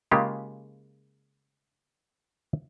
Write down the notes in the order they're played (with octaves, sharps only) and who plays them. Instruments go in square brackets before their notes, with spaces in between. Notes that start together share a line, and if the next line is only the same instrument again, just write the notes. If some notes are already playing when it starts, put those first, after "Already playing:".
[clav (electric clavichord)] C#3 G#3 A#3 C#4 F4 G4